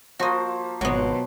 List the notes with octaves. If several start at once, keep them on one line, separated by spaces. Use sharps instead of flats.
F3 A#3 F#4 C5 D#5
G#1 B2 F#3 B3